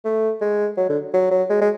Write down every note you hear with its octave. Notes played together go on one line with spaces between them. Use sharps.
A3
G#3
F#3
D3
F#3
F#3
G#3
G#3